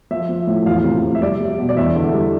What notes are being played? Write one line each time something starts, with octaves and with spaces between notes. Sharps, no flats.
F3 E5
F3
A2
E2 F4 F5
C3
F3
E5
G3 D5
G3
B2
D5
E2 E5
D3
G3